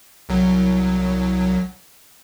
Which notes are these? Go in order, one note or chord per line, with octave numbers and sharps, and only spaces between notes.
C2 F#3